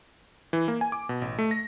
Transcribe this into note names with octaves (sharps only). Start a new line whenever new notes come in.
E3
A#3
G#5
D6
B2
A1
A3
A#6